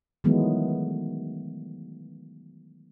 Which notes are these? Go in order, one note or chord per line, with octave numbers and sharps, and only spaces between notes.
D#3 E3 F#3 G#3 A3 B3